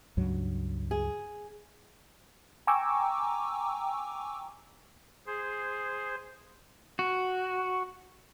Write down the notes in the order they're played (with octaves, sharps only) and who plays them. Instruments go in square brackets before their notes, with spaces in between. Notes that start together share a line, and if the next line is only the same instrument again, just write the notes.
[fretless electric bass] C#2 G2 F#3
[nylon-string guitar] G#4
[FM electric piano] G5 G#5 A#5 C#6 D6 E6
[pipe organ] G#4 C5
[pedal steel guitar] F#4